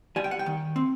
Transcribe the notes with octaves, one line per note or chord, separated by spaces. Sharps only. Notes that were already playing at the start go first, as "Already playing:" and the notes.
G3 G#5
G5
F#5
G5
D#3
C4